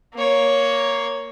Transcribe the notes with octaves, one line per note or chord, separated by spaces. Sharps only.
A#3 C#5